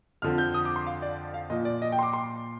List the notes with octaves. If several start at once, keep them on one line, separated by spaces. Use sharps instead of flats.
F2 D3 F3 F6
G6
D#6
D6
C6
F5
D5
F5
A#2 F3 D#5
D5
D#5
G5
C6
D6
C6